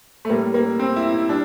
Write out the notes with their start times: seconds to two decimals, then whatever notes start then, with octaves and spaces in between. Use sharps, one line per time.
0.25 A3
0.30 A2 G3 A#3
0.54 A#3
0.79 C4
0.96 E4
1.13 E4
1.29 G3 D4